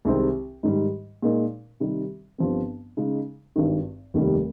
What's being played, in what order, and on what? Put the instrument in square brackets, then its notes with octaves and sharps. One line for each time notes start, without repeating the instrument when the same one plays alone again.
[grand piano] C2 C3 D#3 G#3 C4
G#2 D#3 G3
A#2 G#3 D#4 A#4
C3 D#3 G3
G1 G2 F3 C4
C#3 G#3 D#4
G#1 G2 D#3
F1 D#2 D#3 G3